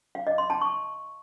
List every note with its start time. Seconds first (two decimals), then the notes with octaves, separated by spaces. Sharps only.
0.15 F5
0.27 D#5
0.38 C6
0.50 A5
0.61 C#6